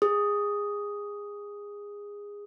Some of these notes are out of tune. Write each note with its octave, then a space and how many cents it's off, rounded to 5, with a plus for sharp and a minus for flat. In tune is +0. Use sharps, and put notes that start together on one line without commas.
G#4 -20 D#6 +0